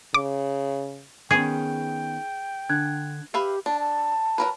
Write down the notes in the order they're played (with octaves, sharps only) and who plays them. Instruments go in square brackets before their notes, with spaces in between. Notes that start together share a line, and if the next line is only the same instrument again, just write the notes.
[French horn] C#3 [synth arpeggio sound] D6
[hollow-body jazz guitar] D#3 B3 C#4 [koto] G#4 [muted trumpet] G5
[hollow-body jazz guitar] D3 [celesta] D4 F#6 G#6
[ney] G4 [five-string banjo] B4 E5 F5
[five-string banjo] D4 [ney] A5
[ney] A5
[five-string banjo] F#3 A#4 B4